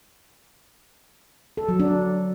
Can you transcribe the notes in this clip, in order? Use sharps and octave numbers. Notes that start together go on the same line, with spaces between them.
A4
F#3
D4